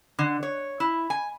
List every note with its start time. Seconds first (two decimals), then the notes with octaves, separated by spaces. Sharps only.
0.19 D3
0.43 C#5
0.80 E4
1.10 G#5